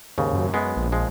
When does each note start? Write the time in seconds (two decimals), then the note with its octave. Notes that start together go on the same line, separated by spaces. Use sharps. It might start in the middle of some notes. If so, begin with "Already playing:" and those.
0.18 D#2 G#2 C#3
0.33 F#2
0.54 G#3 B3
0.76 A#1
0.92 F3 G#3